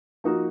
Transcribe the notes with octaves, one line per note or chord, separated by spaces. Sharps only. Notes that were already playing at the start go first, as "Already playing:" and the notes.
F3 A#3 D#4 F#4